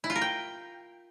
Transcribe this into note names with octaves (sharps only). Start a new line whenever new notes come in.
E4
F4
A#4
G5